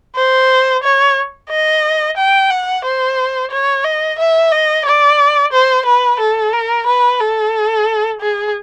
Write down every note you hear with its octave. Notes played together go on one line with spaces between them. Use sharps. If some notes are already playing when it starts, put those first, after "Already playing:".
C5
C#5
D#5
G5
F#5
C5
C#5
D#5
E5
D#5
D5
C5
B4
A4
A#4
B4
A4
G#4